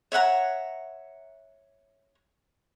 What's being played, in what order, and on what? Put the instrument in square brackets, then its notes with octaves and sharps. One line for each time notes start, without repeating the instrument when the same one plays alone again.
[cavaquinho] C#5 E5 F#5 A#5